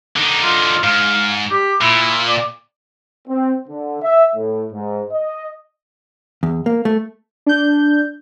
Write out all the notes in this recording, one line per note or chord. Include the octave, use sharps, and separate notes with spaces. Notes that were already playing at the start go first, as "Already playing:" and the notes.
D3 D#4
F4
G#2 F5
G4
A#2 E4
D5
C4
D3
E5
A2
G#2
D#5
E2
A#3
A3
D4 G6